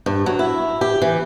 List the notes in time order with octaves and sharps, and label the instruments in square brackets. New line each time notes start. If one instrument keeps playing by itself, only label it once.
[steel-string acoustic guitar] G2
F#3
E4
G4
E3